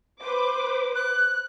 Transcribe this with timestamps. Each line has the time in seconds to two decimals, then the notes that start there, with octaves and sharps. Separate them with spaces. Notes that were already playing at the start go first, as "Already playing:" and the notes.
0.23 B4 C5 D6
0.95 F#6